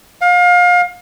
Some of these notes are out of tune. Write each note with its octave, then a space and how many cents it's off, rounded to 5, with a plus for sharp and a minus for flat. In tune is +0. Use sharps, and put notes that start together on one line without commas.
F5 +30